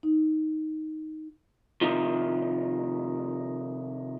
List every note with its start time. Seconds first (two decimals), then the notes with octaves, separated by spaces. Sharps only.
0.03 D#4
1.81 C3 D#3 F3